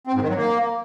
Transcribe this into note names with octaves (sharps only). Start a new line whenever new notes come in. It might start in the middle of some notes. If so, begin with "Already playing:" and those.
C4
G#2
D#3
F#3
A#3